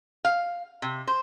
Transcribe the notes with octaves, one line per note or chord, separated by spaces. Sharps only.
F5
C3
C5